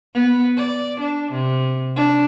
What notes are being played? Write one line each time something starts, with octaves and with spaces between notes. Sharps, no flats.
B3
D5
D4
C3
D4